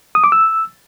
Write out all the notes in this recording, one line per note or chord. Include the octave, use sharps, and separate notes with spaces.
D#6
D6
E6